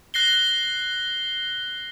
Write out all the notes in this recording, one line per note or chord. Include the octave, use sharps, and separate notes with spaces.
F#6 A#6 C7 G7